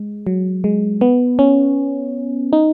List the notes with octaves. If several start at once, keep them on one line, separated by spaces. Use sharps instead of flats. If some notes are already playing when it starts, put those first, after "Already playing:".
Already playing: G#3
F#3
G#3
B3
C#4
D#4